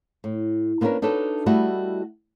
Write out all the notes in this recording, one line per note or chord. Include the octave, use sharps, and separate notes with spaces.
A2
A#3 B3 C#4 D4 A#4 B4
D4 D#4 F#4 A4 B4 C#5
G3 A3 E4 F#4 D#5